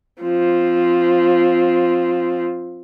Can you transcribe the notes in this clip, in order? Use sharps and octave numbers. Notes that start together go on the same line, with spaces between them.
F3 C4